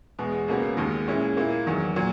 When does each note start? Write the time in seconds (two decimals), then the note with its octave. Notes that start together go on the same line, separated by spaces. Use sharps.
0.19 E2 B2 G#3
0.48 C#2 B2 A#3 C#4 F#4
0.77 D#2 D#3 G#3
1.07 A#2 G#3 C#4 E4
1.37 A#2 A#3 E4
1.67 E2 D#3 F#3
1.96 A#2 F#3